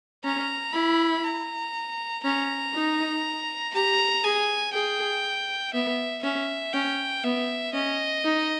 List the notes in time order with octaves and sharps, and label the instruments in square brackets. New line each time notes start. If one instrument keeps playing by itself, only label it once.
[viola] C#4 [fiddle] A#5
[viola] E4 [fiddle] B5
[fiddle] A#5
[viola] C#4 [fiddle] A#5
[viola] D#4
[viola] G4 [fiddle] A#5
[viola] G#4 [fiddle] G#5
[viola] G#4 [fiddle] G5
[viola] B3 [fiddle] E5
[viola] C#4 [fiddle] E5
[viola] C#4 [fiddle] G5
[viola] B3 [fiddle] E5
[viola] C#4 [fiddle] D#5
[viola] D#4